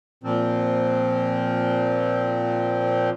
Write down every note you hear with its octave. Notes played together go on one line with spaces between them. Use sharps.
A#2 F3 C4